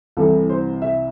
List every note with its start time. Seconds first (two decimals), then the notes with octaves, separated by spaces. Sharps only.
0.17 C2 C3 E3 A4
0.49 C5
0.82 E5